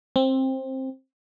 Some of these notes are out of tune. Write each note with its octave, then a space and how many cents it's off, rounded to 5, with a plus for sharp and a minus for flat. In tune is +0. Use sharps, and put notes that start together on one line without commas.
C4 +15